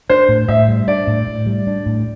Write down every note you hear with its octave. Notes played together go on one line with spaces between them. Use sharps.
D4 C5
A2
A2 E5
G3
D4 D5
A2
A2
G3
D4
A2